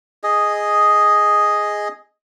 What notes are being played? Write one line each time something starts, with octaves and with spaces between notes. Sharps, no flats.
G#4 D#5